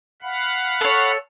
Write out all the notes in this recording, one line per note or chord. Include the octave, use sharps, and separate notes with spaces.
F5 F#5 B5
A4 C#5